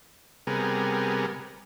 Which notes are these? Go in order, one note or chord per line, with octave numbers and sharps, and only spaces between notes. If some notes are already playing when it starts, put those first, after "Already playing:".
C3 G3 B3 G#4 A#4